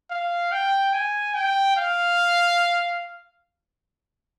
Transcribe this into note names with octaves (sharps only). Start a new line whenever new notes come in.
F5
G5
G#5
G5
F5